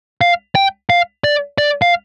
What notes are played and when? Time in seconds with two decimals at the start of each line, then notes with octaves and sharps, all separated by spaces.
0.21 F5
0.55 G5
0.90 F5
1.24 D5
1.58 D5
1.82 F5